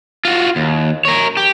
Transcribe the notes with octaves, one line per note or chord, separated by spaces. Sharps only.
F4 F#4
D#2
A#4 C#5
G4